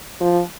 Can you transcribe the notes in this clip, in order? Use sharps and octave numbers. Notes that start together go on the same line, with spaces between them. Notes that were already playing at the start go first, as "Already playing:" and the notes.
F3